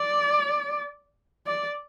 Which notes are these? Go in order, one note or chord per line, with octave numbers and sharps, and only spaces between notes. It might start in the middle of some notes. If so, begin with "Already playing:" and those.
Already playing: D5
D5